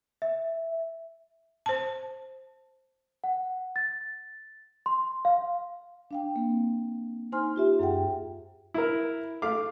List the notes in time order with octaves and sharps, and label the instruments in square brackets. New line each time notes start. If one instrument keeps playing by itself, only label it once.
[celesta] E5
[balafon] C5 A5
[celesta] F#5
A6
C6
F5
[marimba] D4 F5 G5
A#3 C4
D#4 C5 G#5 C6 F6
F4 G4 E5
F#2 G#4 F#5 G5
[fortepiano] E4 A#4
A3 F5 D6